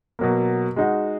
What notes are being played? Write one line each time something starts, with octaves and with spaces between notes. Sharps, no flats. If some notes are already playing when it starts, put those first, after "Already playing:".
B2 F#3 A#3
G#3 D#4 F#4